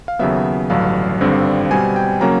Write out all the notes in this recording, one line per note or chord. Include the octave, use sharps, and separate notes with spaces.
F5
D#2 C#3 F#3 B3 E5
A1 G2 D3 F#3 F5
G#1 G2 D3 G3 C4
B2 G3 C4 G#5
G5
C#3 F#3 A#3 C#4 A#5